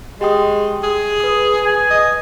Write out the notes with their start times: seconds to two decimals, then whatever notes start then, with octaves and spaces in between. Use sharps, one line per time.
0.21 G#3 G4 G5 D#6
0.83 G#4
1.20 B4 D#6
1.66 G#5
1.90 D#5